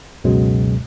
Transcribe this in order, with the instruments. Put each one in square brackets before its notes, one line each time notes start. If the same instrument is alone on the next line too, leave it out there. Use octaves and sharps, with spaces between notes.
[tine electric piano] C#2 F#2 B2 F#3 G#3